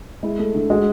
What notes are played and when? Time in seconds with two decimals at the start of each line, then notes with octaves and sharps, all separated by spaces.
0.23 G#3 E4
0.39 A3
0.55 D3
0.70 G#3 F#4